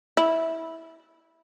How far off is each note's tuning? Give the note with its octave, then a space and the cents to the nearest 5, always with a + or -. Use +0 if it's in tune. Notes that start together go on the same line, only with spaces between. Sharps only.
E4 -15